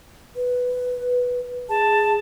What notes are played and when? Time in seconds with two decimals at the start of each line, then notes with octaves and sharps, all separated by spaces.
0.36 B4
1.69 G#4 A5